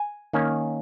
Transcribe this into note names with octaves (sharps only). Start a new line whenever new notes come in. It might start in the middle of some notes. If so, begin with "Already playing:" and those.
Already playing: G#5
D#3 A#3 C#4